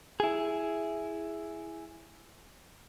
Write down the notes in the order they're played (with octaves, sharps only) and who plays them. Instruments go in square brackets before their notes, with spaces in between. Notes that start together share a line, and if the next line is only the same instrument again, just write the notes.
[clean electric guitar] E4 G#4